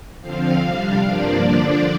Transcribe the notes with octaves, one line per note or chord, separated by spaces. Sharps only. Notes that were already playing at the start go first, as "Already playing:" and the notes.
D3 F3 C4 F5
C3 G3 D4
G2 F3 A#3 D4 D5
D3 F3 D4 D5